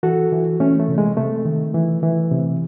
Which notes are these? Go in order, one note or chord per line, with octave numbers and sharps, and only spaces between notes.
E3 F#4 A4
E3
E3 A3 C#4
A3
C3
G#3
C3 A3
D#3
E3
E3
C3